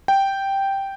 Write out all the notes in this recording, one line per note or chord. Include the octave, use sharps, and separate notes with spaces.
G5